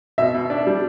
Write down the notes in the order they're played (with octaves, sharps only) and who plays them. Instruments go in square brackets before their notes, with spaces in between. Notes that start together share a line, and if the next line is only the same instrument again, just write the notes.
[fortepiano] B2 [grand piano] E5
[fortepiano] B2
D4
G3